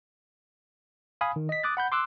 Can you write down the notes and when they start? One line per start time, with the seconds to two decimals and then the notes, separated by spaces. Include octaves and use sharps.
1.21 F5 G#5 B5 D#6
1.36 D#3
1.49 D#5 B6
1.63 D6 D#6 F#6 A6
1.77 F#5 B5 G6
1.92 C6 D6 E6 F#6